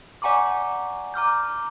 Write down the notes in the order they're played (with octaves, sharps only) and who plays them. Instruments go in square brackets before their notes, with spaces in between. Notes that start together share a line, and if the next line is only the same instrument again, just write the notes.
[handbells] D5 F#5 G#5 A#5 C#6 D6
A#5 D6 F6 G6